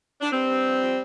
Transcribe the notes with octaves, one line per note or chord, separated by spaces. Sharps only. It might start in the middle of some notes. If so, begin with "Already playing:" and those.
D4
G2 G3 C4
G2
F3
F3